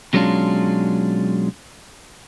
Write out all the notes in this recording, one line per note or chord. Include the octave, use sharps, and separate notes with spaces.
B2 F#3 G#3 C#4 D4 F4